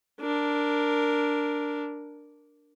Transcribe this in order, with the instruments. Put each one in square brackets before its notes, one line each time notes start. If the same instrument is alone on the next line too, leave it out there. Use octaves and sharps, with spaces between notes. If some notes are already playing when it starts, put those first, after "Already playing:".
[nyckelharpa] D4 A#4